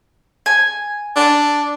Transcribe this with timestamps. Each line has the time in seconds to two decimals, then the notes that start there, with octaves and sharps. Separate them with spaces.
0.46 G#5
1.16 D4